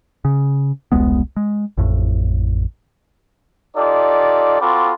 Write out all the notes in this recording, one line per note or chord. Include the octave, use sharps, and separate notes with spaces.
C#3
E1 C2 G#3 B3
G#3
A1 F2 A2
D#4 F4 G4 A4 D5
C4 F4 F#4 A4 B5 D6